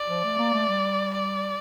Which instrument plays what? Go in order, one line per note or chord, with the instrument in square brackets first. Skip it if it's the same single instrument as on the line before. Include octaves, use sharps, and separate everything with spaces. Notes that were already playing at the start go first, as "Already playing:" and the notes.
Already playing: [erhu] D5
[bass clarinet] F3
A3
A#3
A3
G3
[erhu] D5